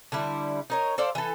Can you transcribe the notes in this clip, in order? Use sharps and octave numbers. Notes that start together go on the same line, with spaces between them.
D3 G3 E4
D#4 A#4 C#5
A4 C5 D5 F5
E3 A4